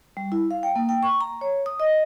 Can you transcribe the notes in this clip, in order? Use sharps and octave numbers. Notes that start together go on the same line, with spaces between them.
G3
E4
F5
G5
A#3
G5
C#6
A#5
C#5
D#6
D#5